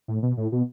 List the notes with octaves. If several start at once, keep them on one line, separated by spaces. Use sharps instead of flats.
A2
B2
A2
B2